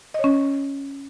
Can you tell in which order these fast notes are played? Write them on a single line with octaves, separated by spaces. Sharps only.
D#5 C#5 C#4